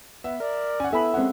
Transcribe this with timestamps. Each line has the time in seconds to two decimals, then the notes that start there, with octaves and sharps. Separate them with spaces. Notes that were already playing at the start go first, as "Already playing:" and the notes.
0.24 B3 E5
0.40 A#4 D5
0.80 C#4 F#5 G#5
0.93 B3 E4 A4 E5 G#5 B5
1.14 G#3 C4 C#4 F#5